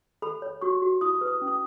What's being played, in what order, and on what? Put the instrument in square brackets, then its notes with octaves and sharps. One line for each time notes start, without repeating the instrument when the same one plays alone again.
[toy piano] A4 B5
C#5
F#4 C#6
F#4
E4 D#6
B4
D#6
C#4
D#6